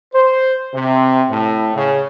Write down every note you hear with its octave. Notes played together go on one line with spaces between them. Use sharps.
C5
C3
A2
C#3